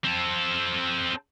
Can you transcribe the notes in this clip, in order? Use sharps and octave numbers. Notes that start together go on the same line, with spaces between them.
C4 A4